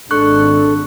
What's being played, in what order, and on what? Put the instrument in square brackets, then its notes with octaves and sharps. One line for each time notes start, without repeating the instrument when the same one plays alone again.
[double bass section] G#1 [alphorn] D4 [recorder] A4 [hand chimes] C#6 F#6